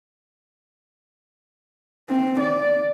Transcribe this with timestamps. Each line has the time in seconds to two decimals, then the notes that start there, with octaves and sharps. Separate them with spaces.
2.10 C4
2.40 D5